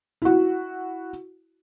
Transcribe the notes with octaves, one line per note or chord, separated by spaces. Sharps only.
E4 F#4